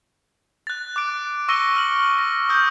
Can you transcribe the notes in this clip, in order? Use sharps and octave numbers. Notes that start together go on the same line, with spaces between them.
F#6 A6
D6 F#6 D7
C#6 E6 A#6 C#7 D#7 G7
F6 F#7
A#6
D#6 F6 G6